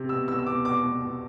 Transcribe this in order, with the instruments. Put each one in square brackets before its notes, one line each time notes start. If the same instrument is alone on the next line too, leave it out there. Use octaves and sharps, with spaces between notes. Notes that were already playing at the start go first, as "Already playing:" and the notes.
Already playing: [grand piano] C3
B2 E6
B2 E6
E6
B2 D6
B2 D6
B2
B2